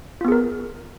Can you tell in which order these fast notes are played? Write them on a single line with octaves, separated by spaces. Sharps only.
F4 B3 G#4 A#4